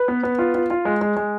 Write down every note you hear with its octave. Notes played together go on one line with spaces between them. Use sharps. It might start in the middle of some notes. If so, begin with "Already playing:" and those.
Already playing: B4
B3
B3
F4
F4
F4
G#3
G#3
G#3